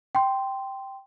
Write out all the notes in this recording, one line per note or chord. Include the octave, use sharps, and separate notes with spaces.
G5 C6